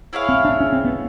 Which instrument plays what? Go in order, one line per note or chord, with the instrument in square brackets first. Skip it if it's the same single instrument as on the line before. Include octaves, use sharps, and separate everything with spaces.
[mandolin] E4 G#4 C#5 F5
[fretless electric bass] C4
D4
C#4
C4
B3